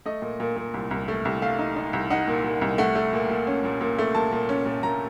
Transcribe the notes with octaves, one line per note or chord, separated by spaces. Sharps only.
A3 D#5
A#2
A#2
A#2
C2
C2
A3
C2
A3 F5
D#4
D#4
C2
D#4 F#5
A#2
A#2
C2
A3 F#5
A3
A#2
A#2
C#4
A#2
A#2
A3
A#2 A5
A#2
C#4
A#2
A#2 A#5